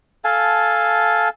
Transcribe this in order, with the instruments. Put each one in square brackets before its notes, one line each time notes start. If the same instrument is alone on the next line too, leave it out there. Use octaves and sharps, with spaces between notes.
[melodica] A4 F5 G#5 A5